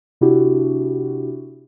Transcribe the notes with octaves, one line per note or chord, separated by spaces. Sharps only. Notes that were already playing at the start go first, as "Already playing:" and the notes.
C3 D4 E4 F#4 G4